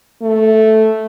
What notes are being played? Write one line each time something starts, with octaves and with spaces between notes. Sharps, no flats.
A3